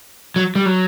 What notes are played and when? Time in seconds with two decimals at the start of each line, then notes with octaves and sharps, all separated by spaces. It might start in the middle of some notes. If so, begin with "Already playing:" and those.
0.36 F#3
0.56 G3
0.66 F#3